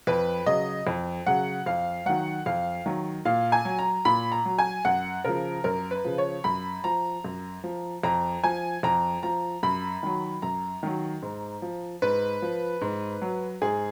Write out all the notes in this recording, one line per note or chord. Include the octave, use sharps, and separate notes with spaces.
F2 B4
C#3 F#3 D#5
F2
C#3 F#3 F#5
F2 F5
D#3 F#3 F#5
F2 F5
D#3 F#3
A#2 F5
G#5
F#3
A#5
A#2 B5
A#5
F#3
G#5
F#2 F#5
C#3 F3 A#4
F#2 A#4
B4
C#3 F3
C#5
F#2 B5
F3 A#5
F#2
F3
F2 A#5
F3 G#5
F2 A#5
F3 A#5
F#2 B5
D#3 F#3
F#2 A#5
D#3 F#3
G#2
F3
G#2 B4
F3
G#2
F#3
G#2 G#4